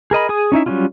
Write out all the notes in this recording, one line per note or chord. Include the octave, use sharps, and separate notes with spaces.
G#4 A#4 D#5 B5
G#4 G#5 D#6
C#4 D#4 E4 E5
F#3 G3 C#4 E4 F4